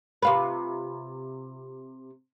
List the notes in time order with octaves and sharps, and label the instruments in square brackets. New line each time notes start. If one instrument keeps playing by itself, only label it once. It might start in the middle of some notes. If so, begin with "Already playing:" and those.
[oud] C3 F4 B4